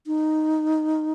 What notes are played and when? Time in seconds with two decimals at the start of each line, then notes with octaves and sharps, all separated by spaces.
0.07 D#4